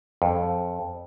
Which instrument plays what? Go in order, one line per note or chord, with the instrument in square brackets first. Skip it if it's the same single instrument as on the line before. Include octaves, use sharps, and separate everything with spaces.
[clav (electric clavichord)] F2